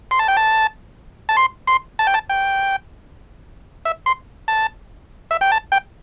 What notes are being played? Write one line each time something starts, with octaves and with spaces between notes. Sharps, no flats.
C6
A5
G5
A5
A5
C6
C6
A5
G5
A5
G5
E5
C6
A5
E5
G5
A5
G5